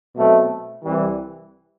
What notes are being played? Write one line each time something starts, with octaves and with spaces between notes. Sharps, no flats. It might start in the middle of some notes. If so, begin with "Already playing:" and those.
B2 F#3 A3 C4
C2 C3 E3 G3